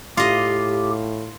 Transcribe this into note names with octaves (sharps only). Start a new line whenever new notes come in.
A2 F4 G4 D#5